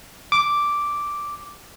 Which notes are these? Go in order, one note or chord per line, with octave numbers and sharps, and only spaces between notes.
D6